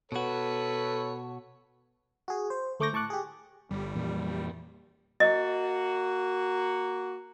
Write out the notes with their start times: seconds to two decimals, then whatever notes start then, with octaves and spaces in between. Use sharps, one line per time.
0.12 B2 F#4 A4 B4 C#5
2.28 F#4 G#4
2.50 C5
2.80 D2 A3 C#6 D6 G6 A#6
2.93 A2 A5 C#6 D6 F#6
3.10 G4 G#4
3.71 G1 G3
3.95 F2 A#2 E3
5.20 A#3 F#4 D#5